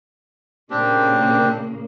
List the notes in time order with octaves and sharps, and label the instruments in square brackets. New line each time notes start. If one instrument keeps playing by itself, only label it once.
[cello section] A#2 C#3 A#3 [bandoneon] C4 D4 G4